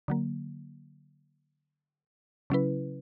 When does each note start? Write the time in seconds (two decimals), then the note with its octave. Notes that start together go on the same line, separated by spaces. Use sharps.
0.08 D3 F#3 A#3
2.50 C#3 F#3 C#4 E4 B4